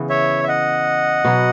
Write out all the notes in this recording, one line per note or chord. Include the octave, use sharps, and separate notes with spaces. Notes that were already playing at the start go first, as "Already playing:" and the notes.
Already playing: C#3 E3 B3
C#5 E5
E5
D#5 F#5
B2 F#3 B3